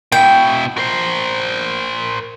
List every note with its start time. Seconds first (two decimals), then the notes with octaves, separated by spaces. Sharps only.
0.12 B2 E4 G5
0.78 A#4 C5